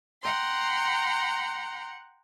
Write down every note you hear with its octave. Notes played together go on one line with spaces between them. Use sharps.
F#5 G5 A#5 C6